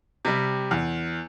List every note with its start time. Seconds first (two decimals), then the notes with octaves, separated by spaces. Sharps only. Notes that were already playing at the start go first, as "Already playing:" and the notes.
0.25 C3 G3
0.71 E2